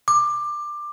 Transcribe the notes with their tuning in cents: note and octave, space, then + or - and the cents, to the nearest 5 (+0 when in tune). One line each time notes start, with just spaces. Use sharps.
D6 +15